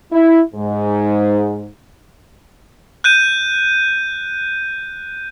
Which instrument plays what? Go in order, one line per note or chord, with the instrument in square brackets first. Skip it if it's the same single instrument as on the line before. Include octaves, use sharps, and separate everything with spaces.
[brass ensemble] E4
G#2
[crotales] F#6 G6 D#7